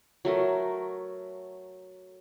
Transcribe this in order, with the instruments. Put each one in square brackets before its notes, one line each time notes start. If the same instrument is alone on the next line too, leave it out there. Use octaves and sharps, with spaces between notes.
[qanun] F#3 A3 A#4